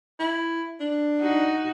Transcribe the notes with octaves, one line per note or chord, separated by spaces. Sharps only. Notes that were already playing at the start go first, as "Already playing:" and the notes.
E4
D4
D#4 F#4